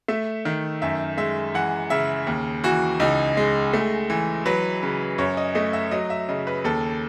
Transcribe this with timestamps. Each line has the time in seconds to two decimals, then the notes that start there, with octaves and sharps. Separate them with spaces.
0.08 A3 E5
0.45 D#3
0.82 F#2 E5
1.17 G#3 E5
1.54 E3 F#5
1.90 C#3 E5
2.27 D#2
2.64 E3 F#4
3.00 C#2 D#4
3.37 G#3
3.74 A3
4.10 E3
4.46 F#3 B4
4.83 C#3
5.18 F#2 C#5
5.37 D#5
5.55 A3 D#5
5.73 E5
5.91 F#3 D#5
6.10 E5
6.29 C#3 D#5
6.47 B4
6.64 D#2 A4